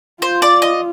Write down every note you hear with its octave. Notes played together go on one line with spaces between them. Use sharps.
F4 C5
D5
D#5